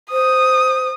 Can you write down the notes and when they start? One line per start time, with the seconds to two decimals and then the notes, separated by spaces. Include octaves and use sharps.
0.12 C5 D#6